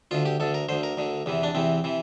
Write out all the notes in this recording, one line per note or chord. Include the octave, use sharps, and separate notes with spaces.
D2 D3 F4
G4
D2 D3 A4
A#4
D2 D3 C5
A#4
D2 D3
E2 C3 E3
D4
E2 C3 E3 C4
C3 E3